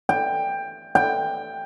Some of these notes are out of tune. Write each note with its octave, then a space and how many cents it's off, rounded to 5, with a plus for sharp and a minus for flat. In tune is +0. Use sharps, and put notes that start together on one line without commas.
G5 +15
G5 +10